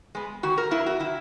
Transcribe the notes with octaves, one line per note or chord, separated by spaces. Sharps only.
G#3 B3
D#3 F#4
A#4
F#3 B3 E4
F#4
D#3 E4